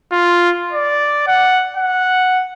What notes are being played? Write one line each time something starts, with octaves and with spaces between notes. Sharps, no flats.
F4
D5
F#5
F#5